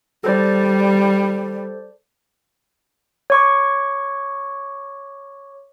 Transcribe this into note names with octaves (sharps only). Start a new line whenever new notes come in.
G3 A4 C5 D5
C#5 C#6 D6